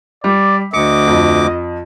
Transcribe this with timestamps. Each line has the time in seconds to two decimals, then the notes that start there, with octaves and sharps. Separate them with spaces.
0.24 G3 D5
0.73 D2 D#5 D6 C#7
1.07 F2